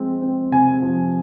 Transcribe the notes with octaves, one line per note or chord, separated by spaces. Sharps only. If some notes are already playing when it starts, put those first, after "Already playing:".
Already playing: F3 G#3 C4
C4
C3 G#5
F3